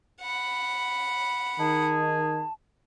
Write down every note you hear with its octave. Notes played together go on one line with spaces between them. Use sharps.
F#5 B5
D#3 D#4 G#4 A5